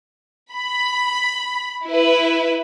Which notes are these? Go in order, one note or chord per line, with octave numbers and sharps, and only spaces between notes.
B5
E4 B4